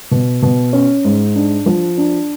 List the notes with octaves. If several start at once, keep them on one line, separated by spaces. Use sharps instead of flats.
B2
B2
C#4
G#2
D4
F3
D4